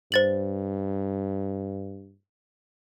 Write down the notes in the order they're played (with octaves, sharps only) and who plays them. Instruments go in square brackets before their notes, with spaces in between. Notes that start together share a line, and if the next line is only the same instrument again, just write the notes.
[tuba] G2 [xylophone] C5 A6 F#7